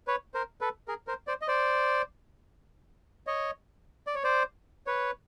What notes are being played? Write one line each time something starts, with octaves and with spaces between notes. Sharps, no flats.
B4 C#5
A#4 C5
A4 B4
G#4 A#4
A#4 C5
C5 D5
D#5
C5 D5
C#5 D#5
D5
C#5
C5 D5
B4 C#5